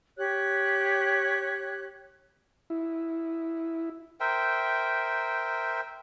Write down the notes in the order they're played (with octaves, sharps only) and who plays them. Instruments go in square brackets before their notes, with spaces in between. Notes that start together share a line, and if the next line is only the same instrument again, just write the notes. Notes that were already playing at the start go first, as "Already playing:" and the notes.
[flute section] G4 C#5 F#6
[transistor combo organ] E4
[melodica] A#4 C5 E5 G5